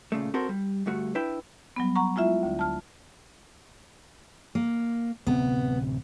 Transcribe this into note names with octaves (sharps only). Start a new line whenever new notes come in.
A#2 C#3 A3
C4 F#4 A4 A#4 C5
G3
D2 G2 A3 F#4
D4 E4 B4 E5 G5
F#3 G3 B3
F#5 A#5 C#6
G#3 E4 F4 E5
D2 D3
A5 F6
A#3
D1 C3 B3 C4